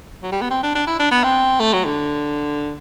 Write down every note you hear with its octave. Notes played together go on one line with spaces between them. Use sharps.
F#3
G3
B3
C4
D4
D4
E4
D4
B3
C4
A3
F#3
D3